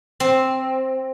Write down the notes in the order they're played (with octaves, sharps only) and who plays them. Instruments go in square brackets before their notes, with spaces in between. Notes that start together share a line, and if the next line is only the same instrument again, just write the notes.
[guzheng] C4